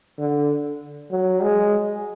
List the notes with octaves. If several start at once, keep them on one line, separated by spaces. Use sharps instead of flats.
D3
F#3
G#3